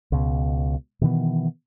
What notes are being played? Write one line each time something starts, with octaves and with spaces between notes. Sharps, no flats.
C#2 B2
B2 D#3 E3 B3